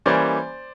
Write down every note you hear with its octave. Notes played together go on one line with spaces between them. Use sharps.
E3 G3 A#3 C#4 C5 D5